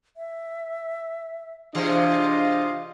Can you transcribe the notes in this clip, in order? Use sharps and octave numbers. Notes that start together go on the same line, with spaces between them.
E5
C3 E3 D4 F4 G#4 C5 D#5 F5